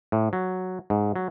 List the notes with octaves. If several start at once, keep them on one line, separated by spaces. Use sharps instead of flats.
A2
F#3
G#2
F#3